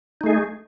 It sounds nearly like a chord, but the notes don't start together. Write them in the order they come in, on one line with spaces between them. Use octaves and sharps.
D#4 A3 G#4